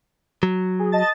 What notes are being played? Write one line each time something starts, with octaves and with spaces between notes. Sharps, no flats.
F#3
G#4
D#5 A5 A6